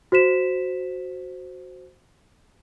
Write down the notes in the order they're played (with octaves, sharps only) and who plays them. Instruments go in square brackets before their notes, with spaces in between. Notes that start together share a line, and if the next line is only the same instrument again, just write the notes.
[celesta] F#4 C5 B6 E7